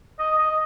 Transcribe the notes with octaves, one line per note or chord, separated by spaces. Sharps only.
D#5
D#5